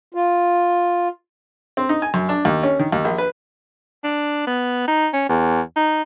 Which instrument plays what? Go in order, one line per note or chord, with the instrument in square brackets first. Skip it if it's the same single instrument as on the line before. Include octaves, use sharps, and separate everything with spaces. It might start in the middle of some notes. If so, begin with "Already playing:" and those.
[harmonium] F4
[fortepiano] C4
D#4
G#5
F#2
D4
D#2
C#4
D#3
D#2
A#1
B4
[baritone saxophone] D4
B3
D#4
C#4
E2
D#4